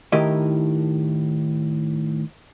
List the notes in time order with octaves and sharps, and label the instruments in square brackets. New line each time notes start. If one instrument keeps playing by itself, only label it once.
[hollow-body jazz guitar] A2 D#3 E4 G4 A#4 D#5